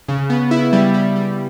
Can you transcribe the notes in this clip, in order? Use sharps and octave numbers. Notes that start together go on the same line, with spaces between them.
C#3
B3
E4
G3
G3
G3